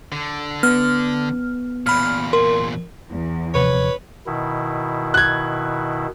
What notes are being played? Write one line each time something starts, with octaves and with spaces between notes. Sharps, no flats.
D3
B3 F6
E2 A#2 B5 F6
A#4 C6
E2
D#1 C3 F3 B4 C#5
B2 D#3 E4
F#6 G#6